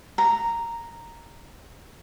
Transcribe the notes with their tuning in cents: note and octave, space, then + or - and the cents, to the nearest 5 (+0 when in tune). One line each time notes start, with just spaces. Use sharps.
A#5 -5